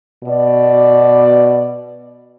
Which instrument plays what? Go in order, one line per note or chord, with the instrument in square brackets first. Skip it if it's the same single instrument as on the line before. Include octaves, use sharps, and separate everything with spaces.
[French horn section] B2 D5